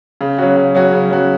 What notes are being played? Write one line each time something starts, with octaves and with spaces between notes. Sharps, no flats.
C#3
F#3 C#4 F#4
C#3
F#3 C#4 F#4
C#3
F#3 C#4 F#4